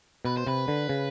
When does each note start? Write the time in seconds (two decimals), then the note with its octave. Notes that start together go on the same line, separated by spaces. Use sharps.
0.25 B2 B4
0.37 C5
0.47 C3 B4
0.68 D3
0.89 C#3